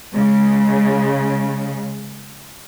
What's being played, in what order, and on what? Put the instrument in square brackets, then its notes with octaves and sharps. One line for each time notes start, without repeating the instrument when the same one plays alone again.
[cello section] C#3 G#3